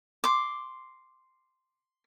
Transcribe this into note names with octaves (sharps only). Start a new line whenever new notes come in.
C6 D6